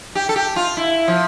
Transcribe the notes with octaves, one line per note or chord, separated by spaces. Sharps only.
G4
A4
G4
F4
E4
F3